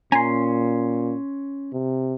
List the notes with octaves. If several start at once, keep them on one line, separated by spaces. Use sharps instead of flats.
A#2 C#4 G#5 A#5 C6
C3